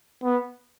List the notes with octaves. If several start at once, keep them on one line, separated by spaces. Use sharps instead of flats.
B3